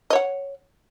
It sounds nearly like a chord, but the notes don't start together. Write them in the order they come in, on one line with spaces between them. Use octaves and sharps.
D#5 C#5 F#5